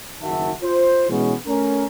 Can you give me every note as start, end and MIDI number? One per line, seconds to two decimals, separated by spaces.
0.21 0.50 30
0.21 0.50 51
0.21 0.50 63
0.21 0.50 66
0.21 0.50 76
0.21 0.50 81
0.62 1.05 65
0.62 1.05 72
1.09 1.32 47
1.09 1.32 52
1.09 1.32 56
1.09 1.32 59
1.09 1.32 61
1.46 1.84 57
1.46 1.84 61
1.46 1.84 70